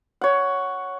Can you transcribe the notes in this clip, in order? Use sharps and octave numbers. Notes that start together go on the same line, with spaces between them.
C#5 F#5